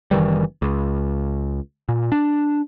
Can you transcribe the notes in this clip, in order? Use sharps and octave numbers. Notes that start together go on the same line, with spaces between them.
F#1 D#3 E3 G3
C#2
A#2
D4